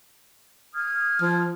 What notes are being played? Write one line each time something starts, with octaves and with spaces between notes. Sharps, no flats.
D#6 F6 G#6
F3